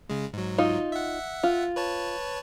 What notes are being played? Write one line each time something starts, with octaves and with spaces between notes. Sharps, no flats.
C#3 G#3
G#2 F#3
D#4 F4
E5 F#5
F4
B4 C#5 A5